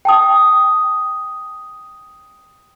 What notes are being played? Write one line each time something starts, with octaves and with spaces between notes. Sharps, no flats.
G5 A5 D#6